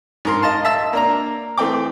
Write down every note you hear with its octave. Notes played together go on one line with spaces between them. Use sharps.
G#2 A#4 C6
D#5 F5 A5 C6
E5 A5 E6
A#3 D4 A#5
E3 A3 C4 G5 D6